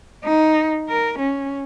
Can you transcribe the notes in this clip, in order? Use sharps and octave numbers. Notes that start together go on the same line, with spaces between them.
D#4
A#4
C#4